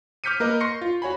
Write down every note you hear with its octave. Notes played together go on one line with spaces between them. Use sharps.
D6 F6 G6 B6 C#7 D#7
A#3 A#4 B4 D#5
C6 C#6 A#6 C7 C#7
F4
F#4 C#5 G#5 B5